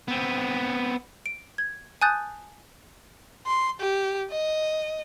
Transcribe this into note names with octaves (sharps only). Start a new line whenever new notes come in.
B3 C4
D7
G#6
G#5 A5 D#6 F#6 G6 A6
C6
G4
D#5